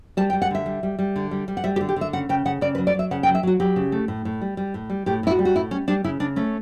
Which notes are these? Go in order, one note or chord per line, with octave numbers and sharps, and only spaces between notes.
G3 A5
G5
G3
F#5
D3 E5
G3
G3
G3
D3
G3
G3
F#5
G3 E5
G4
D3
G4
D3 E5
C#3 F#5
C#3 G5
C#3 F#5
C#3 D5
B4
F#3
D5
F#3 E5
C#3 F#5
G5
F#3
E5
F#3 F#4
F#3 G4
C#3
A3
A2
A2
G3
G3
A2
G3
A2 G4
A2 E4
F#4
G3
F#4
A2 E4
G3 C#4
G3 D4
C#3 E4
C#3 D4
A3 C#4